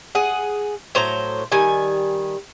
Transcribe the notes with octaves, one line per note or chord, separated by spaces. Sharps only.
G#4 F#5
A2 F#3 C5 A#5
D#3 G3 G#5